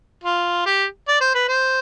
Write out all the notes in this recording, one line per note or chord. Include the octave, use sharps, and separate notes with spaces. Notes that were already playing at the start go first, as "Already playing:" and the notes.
F4
G4
D5
C5
B4
C5